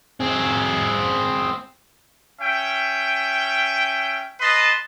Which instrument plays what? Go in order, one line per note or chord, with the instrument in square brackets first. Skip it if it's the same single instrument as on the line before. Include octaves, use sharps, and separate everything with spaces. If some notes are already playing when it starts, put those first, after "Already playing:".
[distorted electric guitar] C4 G#4
[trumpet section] C#4 E5 G5
B4 D#5 A5 C6